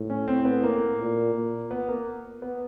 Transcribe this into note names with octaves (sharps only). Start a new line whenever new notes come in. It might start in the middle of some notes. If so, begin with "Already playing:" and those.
Already playing: A2
C#4
C4
B3
A#3
A#2
A#2
B3
A#3
B3